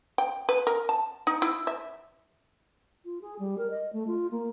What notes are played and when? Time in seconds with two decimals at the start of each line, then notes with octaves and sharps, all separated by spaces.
0.18 G5
0.49 B4
0.67 A#4
0.89 A5
1.27 D#4
1.42 E4
1.67 E5
3.05 F4
3.22 G#4
3.39 G3
3.58 A#4
3.70 D#5
3.93 A3
4.07 F4
4.31 A#3